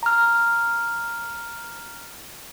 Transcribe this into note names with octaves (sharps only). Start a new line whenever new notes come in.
A#5 F6